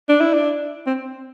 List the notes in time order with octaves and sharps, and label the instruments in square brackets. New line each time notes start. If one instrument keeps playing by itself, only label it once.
[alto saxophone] D4
E4
D4
C4